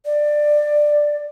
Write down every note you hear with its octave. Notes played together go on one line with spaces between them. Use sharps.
D5